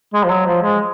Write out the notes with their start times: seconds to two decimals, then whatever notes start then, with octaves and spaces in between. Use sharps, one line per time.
0.14 G#3
0.24 F3
0.30 F#3
0.46 F3
0.62 G#3